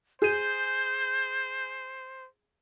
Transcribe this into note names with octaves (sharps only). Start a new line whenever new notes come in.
G#4 C5 G6 D#7